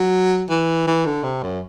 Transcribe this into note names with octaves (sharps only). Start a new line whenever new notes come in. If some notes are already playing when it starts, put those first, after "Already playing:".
Already playing: F#3
E3
E3
D3
C3
F#2